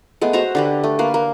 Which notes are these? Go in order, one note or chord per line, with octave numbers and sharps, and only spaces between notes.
G#3 A3 B3
F#4 C5 E5 A#5
D3 G4 B4
A3
A#3 B4
A#3